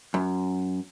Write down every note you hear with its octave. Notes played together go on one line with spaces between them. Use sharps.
F#2